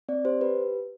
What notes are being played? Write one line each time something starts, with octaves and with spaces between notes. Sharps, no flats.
C4 D5
G4 C5
G4 B4